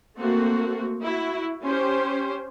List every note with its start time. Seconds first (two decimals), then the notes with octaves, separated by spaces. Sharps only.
0.18 A3 A#3 C4 F#4
1.01 E4 F#4
1.61 C#4 G4 C5